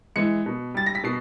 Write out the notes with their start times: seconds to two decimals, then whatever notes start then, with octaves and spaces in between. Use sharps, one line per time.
0.16 E3 G#3 C#7
0.46 B2
0.74 G3 A6
0.86 A#6
0.95 B6
1.04 B2 C7